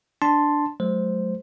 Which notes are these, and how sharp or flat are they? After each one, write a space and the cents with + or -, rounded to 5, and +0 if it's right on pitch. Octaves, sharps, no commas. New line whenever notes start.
D4 +0 A5 +0 C6 +0
F#3 +0 A3 -40 C5 -5